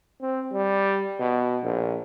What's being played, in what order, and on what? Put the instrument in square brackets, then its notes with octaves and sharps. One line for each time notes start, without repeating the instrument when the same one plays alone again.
[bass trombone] C4
G3
B2
A#1